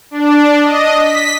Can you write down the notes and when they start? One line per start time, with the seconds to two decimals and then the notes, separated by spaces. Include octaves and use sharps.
0.11 D4
0.63 D#5
1.01 B6